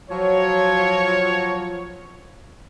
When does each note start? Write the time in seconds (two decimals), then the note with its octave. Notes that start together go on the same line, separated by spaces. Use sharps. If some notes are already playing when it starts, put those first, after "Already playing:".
0.10 F3 F#3 C#5